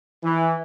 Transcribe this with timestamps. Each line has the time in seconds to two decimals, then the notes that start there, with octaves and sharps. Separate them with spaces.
0.24 E3